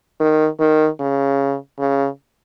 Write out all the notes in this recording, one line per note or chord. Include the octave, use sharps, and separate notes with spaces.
D#3
D#3
C#3
C#3